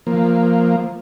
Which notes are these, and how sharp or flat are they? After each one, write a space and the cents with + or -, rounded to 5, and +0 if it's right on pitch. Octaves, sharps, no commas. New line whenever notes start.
F3 +0 A#3 +0